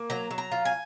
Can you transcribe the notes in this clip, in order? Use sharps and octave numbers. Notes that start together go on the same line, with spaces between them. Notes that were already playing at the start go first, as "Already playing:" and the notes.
Already playing: A#3
F#3 A#5
F#3
A#5
F4
G#5